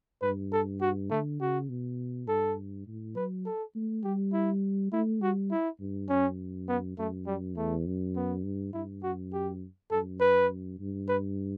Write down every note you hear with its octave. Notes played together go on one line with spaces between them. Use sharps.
G2 B4
A4
F#4
D3 A3
C#3 F#4
B2
G2 A4
A2
F#3 B4
A4
A3
G3 G4
E4
A3 E4
G3 F#4
E4
G2
F#2 C#4
B3
F#2 A3
G3
E2 A3
F#2
B3
G2
G2 E4
F#2 F#4
G4
F#2 A4
B4
G2
B4